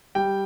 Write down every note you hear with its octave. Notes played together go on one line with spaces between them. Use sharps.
G3 G5